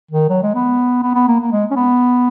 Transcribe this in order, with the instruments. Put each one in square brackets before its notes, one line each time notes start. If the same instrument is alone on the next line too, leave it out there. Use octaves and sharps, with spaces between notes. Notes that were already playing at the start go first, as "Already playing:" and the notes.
[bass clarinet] D#3
F#3
G#3
B3
B3
B3
A#3
A#3
G#3
C#4
B3